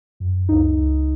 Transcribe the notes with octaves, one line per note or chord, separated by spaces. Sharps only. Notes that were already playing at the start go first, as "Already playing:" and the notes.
F#2
C#2 D#4
C#2